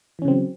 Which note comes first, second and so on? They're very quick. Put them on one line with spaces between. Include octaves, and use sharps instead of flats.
E3 C#4 C#3 C4 F#3